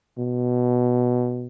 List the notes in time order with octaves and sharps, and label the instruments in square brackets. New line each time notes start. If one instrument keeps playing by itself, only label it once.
[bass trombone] B2